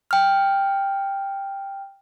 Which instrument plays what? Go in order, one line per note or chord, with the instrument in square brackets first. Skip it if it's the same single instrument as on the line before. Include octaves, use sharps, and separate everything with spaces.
[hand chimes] G5 F6